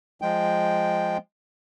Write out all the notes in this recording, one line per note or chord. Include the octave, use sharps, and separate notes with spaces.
F3 G#3 G5